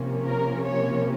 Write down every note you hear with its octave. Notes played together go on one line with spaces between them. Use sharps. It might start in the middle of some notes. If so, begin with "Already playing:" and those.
Already playing: C3 F3 A#3 C#4
A#4
C#5